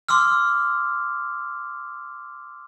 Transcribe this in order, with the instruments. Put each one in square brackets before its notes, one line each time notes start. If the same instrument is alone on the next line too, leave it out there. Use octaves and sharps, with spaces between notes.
[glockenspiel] C6 D6 E6 F6